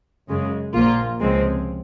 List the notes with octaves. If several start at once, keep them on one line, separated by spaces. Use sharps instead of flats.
F#2 C#3 G#3
A#1 A#2 F3 A#3 F4
C#2 C3 F3 G#3 C4